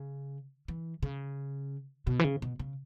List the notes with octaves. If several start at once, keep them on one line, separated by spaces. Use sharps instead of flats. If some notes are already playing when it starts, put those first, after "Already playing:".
Already playing: C#3
E3
C#3
B2
E3
C#3
B2
C#3